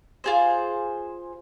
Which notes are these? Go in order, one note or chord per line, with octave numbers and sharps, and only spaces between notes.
F4 G#4 C5